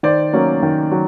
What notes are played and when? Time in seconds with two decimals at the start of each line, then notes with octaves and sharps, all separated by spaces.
0.03 D#3 C5 D5
0.33 F#3 A#3 C#4
0.63 D#3
0.92 F#3